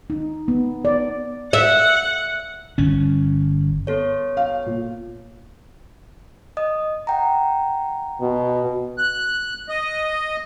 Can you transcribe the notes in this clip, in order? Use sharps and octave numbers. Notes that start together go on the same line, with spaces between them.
D#4
B3
D5
E5 F#5
G1 C#4
B3 A4 C#5
F5
A#2
D#5 D#6
F#5 G5 A#5
B2
F#6
D#5